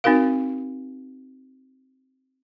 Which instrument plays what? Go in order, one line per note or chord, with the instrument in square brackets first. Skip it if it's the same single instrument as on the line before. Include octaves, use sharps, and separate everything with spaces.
[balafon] C4 D#4 F#4 A#4 F5